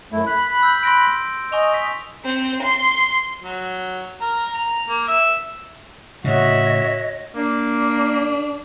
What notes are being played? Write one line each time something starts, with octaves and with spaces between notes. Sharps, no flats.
F#2 A3 E4
B5 F#6
E6 G6
C6 A#6 D7
D#5 G#5 C#6 F7
B6
C4
C6
F#3
A#4
A#5
A#3
E5
A2 C#3 F#4 C#5 D#5 E5
A#3 D4